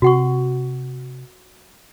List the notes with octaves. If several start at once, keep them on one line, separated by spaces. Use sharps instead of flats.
C3 F#4 F#5 C#6